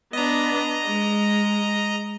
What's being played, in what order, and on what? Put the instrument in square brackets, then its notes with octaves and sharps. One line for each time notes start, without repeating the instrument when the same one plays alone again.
[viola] B3 D4 [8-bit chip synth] D#5 A#5
[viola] G#3